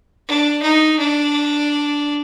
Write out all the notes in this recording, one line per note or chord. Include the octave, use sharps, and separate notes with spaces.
D4
D#4
D4